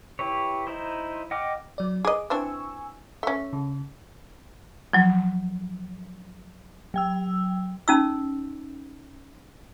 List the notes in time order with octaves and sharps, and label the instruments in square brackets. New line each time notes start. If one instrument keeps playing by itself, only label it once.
[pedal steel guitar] E4 G4 B4 C#5
D#4 E4 C5
D#5 F#5 G5 D6 F6
[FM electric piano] F#3 D5
[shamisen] G#4 D#5 [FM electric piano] D6
[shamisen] E3 C4 D4 [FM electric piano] G#5 C#6 E6
[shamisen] A3 C#4 [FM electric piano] E5
[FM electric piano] C#3
[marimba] F3 F#3
[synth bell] F#3 G5 E6
[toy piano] C#4 D#4 E6